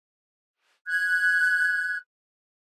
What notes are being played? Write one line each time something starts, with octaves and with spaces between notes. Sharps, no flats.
F#6 G#6